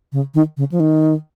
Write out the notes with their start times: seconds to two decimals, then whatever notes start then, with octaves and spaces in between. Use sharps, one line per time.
0.12 C#3
0.34 D#3
0.57 C#3
0.72 F3
0.80 D#3